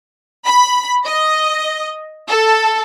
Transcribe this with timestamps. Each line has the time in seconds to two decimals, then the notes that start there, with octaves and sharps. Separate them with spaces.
0.45 B5
1.06 D#5
2.28 A4